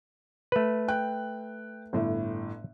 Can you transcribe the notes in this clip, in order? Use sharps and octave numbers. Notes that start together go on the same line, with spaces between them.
A3 B4
G5 F#6
G1 A2